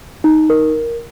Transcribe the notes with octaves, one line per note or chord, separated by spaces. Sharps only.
D#4
A#4